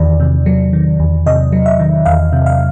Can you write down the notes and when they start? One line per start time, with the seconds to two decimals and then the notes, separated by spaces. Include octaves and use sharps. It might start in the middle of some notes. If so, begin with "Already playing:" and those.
Already playing: E2 D#3 D5
0.20 C3
0.46 F#3
0.73 D#3
1.00 E2
1.26 C3 D#5
1.52 F#3
1.66 E5
1.80 D#3
2.05 E2 F5
2.33 C3
2.46 F5